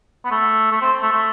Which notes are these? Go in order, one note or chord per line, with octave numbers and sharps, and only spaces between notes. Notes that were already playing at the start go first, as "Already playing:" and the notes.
B3
A3
A3
C4
A3
A3